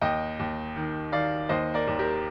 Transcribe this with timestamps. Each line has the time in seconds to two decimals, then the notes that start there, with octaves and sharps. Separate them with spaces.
0.01 D#2 D#5 G5
0.39 D#2
0.76 D#3
1.12 D#3 D5 F5
1.49 D#2 C5 D#5
1.74 A#4 D5
1.87 D#2
1.99 G4 A#4